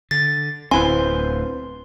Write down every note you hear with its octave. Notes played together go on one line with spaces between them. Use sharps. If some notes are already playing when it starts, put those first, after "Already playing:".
D3 A6
D1 D2 B3 C4 E4 C5 G#5 C6